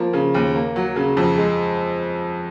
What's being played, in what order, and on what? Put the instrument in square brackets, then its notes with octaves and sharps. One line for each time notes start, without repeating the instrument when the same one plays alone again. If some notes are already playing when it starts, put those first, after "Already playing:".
Already playing: [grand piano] F3 A#3
C#3
D#2
A#3
F#3
C#3
F2
G#3